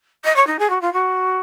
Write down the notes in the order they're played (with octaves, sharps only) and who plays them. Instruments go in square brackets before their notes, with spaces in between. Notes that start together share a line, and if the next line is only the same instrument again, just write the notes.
[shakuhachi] D#5
C#5
D#4
G#4
F#4
F4
F#4